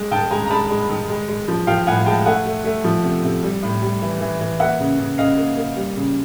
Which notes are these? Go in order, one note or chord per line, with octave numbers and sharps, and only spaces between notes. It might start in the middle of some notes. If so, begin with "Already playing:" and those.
Already playing: G#3
D#3 G5 A5
G#3 G#5 A#5
A#5
G#3 A5 B5
G#3
D#3
G#3
G#3
F3
F3 F5 G5
A2 F#5 G#5
G#3 G5 A5
A3 F#5 G#5
A3
A3
F3
C3
C3
G3
A2
G3
E3
E3
E3
A#3 E5 F#5
C#3
C#3
C#3 D#5 F5
A#3
A#3
G3
C#3